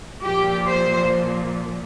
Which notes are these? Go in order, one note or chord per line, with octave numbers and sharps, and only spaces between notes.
A#2 F3 G4
C5